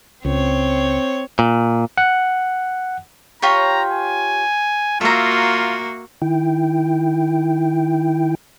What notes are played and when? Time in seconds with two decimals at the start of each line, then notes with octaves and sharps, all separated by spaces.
0.25 C#2 C4 C#5
1.39 A#2
1.98 F#5
3.42 F4 G4 C#5 A#5
3.91 G#5
5.01 A#3 F4 F#4 E5 A#5
6.22 D#3 E4 G5